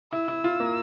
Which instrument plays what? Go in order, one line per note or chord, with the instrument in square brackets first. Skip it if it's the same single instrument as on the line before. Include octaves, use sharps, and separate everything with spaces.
[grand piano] E4 [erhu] E6
[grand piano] E4
F4
A#3